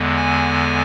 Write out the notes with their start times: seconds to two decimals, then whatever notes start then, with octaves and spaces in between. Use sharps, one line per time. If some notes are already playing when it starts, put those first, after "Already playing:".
Already playing: E2 D3 G#3 B3
0.17 G#5